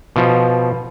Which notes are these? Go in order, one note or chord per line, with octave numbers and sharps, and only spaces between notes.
B2 F3